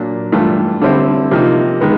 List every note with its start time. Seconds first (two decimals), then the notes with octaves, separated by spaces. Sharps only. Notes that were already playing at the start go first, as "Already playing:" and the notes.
Already playing: A#2 F#3 A#3 D4
0.32 G2 E3 A3 D4 F4
0.82 D3 G3 C4 E4
1.31 C3 F3 A#3 D#4
1.80 D#3 G#3 B3